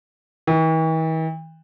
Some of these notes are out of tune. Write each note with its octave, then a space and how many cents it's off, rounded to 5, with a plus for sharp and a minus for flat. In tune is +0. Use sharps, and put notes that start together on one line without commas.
E3 -45